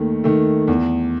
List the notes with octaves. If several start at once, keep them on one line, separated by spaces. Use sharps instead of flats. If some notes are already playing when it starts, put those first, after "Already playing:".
Already playing: D#2 D#3 A3
D#3 A3
E2